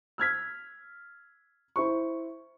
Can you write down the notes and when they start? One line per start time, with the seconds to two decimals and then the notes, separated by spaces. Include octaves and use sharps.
0.18 E6 F6 G#6 B6
1.76 E4 C5 C#6